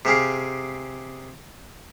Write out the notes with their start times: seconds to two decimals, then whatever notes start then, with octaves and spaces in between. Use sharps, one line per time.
0.05 C3 G4 G#4 F5